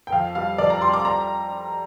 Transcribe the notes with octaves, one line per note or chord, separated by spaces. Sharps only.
G5
F2 F5
G3 F5
F2 D5
A#5
G3 C6
D6
A#5